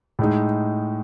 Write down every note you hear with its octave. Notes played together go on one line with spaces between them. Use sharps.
A2 G#3 D#4